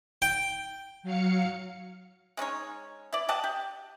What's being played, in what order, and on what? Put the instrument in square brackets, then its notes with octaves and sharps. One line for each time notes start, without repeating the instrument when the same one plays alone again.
[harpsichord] G5
[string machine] F#3 F5 C#7
[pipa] G#3 C#4 D#4 C#5
E4 D5
G4 D#5 F#5 A5
G4